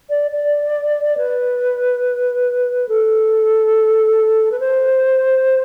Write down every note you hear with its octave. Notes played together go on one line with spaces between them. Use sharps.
D5
D5
B4
A4
B4
C5